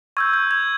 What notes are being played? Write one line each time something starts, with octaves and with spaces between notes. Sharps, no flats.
C#6 E6 G6 G#6
G6
G#6